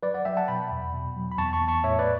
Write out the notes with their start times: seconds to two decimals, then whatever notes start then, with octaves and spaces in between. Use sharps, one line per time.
0.03 F#3 B4 D5
0.14 D5 F#5
0.25 F#3 E5 G5
0.37 F#5 A5
0.48 B2 G5 B5
0.71 E2
0.94 B2
1.16 F#3
1.31 B5
1.38 E2 A5 C#6
1.53 A5 C#6
1.62 E2
1.68 A5 C#6
1.83 A2 C#5 E5
1.99 B4 D5